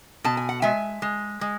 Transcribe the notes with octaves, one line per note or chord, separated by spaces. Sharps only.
B2 A5
G#5
F#5
G#3 E5 G#5
G#3
G#3